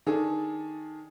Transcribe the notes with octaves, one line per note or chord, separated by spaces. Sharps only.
D#3 D4 G#4 A4